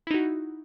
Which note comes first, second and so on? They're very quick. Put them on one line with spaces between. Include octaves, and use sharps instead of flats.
E4 D#4 F#4